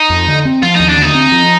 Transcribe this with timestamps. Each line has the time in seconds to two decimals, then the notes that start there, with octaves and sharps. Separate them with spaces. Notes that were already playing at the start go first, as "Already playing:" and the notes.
Already playing: D#4
0.10 F2
0.27 D3
0.45 C4
0.63 F3 F4
0.76 D#2 D#4
0.89 D4
0.97 D3
1.02 D#4
1.15 C4
1.32 F3